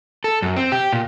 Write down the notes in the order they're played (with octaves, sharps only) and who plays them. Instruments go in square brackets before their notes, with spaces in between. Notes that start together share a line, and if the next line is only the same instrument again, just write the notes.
[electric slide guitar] A4
F#2
C4
G4
A#2